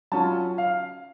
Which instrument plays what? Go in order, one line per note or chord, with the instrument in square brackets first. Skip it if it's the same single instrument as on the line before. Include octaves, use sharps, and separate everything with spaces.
[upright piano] F#3 C#4 F4 A5
F5